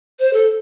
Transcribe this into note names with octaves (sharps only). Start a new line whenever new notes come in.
C5
A4